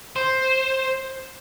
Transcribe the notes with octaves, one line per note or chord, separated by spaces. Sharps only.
C5